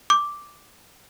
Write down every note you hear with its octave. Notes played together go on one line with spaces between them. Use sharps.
D6